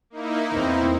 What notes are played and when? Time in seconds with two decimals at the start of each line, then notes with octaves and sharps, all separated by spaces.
0.10 A#3 D#4 E4
0.53 E2 C4